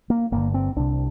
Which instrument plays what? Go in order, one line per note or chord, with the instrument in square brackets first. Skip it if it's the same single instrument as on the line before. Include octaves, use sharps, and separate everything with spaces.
[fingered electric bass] A#3
G1 G2 D3 A#3
C4
C2 C3 D4